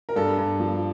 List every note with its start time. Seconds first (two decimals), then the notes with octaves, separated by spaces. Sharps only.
0.09 A#4
0.16 G2 A4
0.37 G2
0.60 F3